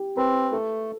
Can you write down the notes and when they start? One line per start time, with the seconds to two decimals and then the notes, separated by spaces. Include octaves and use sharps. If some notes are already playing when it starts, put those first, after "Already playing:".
Already playing: G4
0.17 C4 B4
0.51 A3 A4